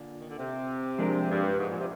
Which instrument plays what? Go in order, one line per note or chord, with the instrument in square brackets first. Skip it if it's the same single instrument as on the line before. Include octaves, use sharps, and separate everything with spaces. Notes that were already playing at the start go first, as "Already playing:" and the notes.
Already playing: [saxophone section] A#2 D3
D#3
D3
C3
[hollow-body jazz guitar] F3 G#3 D4 G4 A#4
[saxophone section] G2
G#2
A#2
C3